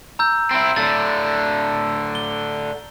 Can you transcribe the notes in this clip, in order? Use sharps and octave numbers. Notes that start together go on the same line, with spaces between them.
A#5 E6 G6
C4 E4
A2 D3 A6
G7